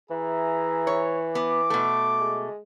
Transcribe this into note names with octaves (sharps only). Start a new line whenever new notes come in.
E3 G#4 E5 A#5
C#5
B3 D6
B2 A3
G#3